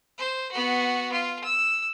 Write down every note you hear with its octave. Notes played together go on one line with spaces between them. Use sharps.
C5
B3 F#4
F4
E6